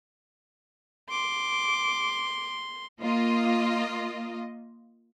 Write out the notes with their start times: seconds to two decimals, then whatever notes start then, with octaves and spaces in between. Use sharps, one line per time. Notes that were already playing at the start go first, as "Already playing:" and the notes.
1.10 C6 D6
3.02 A#3 F4 D#5